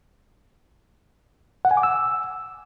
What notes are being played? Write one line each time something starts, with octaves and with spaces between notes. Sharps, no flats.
F#5
G#5
D6
E6